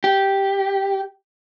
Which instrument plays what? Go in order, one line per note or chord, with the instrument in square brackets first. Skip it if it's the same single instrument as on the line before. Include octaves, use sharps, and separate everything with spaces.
[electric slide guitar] G4